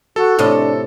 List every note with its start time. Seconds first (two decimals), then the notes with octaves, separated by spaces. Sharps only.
0.16 F#4 A4
0.39 A2 C3 D4 D#5